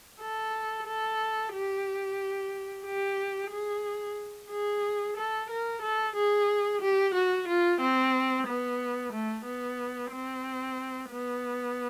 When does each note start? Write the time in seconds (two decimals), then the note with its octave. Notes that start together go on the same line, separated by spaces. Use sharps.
0.21 A4
0.87 A4
1.53 G4
2.85 G4
3.51 G#4
4.50 G#4
5.17 A4
5.50 A#4
5.82 A4
6.15 G#4
6.81 G4
7.14 F#4
7.48 F4
7.81 C4
8.47 B3
9.13 A3
9.45 B3
10.11 C4
11.10 B3